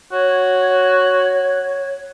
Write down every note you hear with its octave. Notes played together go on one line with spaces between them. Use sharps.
F#4 C#5